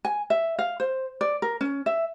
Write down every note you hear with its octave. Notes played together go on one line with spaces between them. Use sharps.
G#5
E5
F5
C5
D5
A#4
C#4
E5